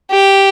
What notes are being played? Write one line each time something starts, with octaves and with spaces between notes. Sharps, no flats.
G4